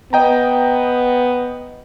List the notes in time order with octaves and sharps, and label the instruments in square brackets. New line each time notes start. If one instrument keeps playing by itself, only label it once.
[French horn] B3 [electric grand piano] D#5 G5 A#5